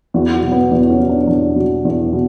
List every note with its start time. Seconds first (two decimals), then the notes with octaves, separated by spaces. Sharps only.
0.14 E2 F#4
0.33 F#4
0.43 B2 F#3
0.52 B3
0.71 E2 B3
0.90 C#4
0.99 B2 F#3
1.09 D4
1.27 E2 D4
1.56 B2 F#3
1.85 E2
2.13 B2